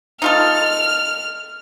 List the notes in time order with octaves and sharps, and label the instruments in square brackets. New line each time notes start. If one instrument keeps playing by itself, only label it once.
[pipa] D#4 F4 A4 [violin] F6